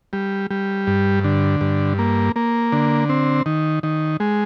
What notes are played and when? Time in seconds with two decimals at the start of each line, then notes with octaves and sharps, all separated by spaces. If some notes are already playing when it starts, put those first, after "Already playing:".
0.13 G3
0.51 G3
0.87 G2
1.24 D3
1.61 G2
1.98 A#3
2.36 A#3
2.72 D3
3.09 C4
3.46 D#3
3.83 D#3
4.20 G#3